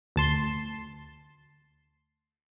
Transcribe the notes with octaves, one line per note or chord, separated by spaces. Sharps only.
D2 A5 C6